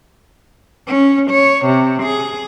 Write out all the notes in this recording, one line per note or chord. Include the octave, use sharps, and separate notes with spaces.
C#4
C#5
C3
G#4